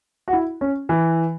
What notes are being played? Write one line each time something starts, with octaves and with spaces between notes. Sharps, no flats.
F#4
E4
C#4
E3